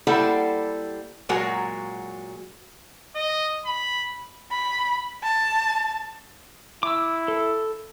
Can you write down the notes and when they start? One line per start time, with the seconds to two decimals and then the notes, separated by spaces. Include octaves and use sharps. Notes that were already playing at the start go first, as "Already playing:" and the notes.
0.07 G3 A#3 E4 A4 C5 F#5
1.29 A#2 F#3 G#3 F#4 A#4
3.15 D#5
3.66 B5
4.51 B5
5.23 A5
6.83 E4 D6 E6
7.28 A4